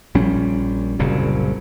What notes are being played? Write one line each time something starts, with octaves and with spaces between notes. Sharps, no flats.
A#1 G3 C#4
F#1 C2 A#2 C#3